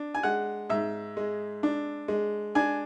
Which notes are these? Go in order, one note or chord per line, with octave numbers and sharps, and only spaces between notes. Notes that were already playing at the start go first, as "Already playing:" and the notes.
Already playing: D4
G#5
G#3 F#5
G#2 E5
G#3
D4
G#3
D4 G#5